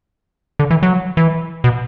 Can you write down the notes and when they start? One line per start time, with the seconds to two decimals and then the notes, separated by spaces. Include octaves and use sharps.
0.59 D3
0.71 E3
0.83 F#3
1.17 E3
1.64 B2